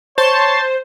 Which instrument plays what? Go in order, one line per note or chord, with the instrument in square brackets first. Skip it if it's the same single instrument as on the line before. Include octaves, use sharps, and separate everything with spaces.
[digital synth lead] C5 [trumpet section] C#5 [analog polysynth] A5 C6